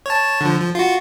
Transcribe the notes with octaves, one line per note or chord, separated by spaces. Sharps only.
C#5 A5
D3 F3
F3
F4 F#4